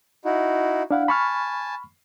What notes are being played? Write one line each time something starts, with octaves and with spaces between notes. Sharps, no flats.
D#4 E4 F#4
D4 E4 F5 F#5
G#5 A5 B5 C#6 F6